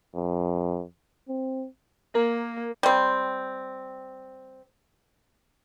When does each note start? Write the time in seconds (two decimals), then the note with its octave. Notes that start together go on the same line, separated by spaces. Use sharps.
0.15 F2
1.28 C4
2.15 A#3 A#4
2.83 G3 C4